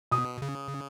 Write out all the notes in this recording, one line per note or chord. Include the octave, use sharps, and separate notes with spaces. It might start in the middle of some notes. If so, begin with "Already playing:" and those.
B2 D#6
C#3